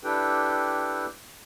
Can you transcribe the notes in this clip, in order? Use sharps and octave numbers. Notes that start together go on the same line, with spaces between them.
D4 E4 G4 A4 B4 G5